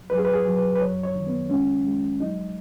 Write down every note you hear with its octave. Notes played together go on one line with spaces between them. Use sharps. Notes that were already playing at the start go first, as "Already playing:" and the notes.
Already playing: F#2
F#3 B4
G#4
B4
G#4
F#3
B4
B4
F#2 C#5
C#5
D#3
B3
G#3 C#4
G#3
F#3 D#4